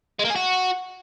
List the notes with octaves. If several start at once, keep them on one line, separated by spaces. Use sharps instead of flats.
G#3
A#3
G#4
F#4